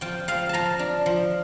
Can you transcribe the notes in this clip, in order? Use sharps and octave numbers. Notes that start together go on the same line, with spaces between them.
F3 G5
F3 F5
F3 A5 A#5
D4
F3